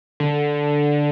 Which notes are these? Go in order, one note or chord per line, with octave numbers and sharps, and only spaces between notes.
D3